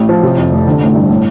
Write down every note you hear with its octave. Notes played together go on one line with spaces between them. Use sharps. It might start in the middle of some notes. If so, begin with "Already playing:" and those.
Already playing: A1
F3
C3
F2
F1
D3
A1
G2
A2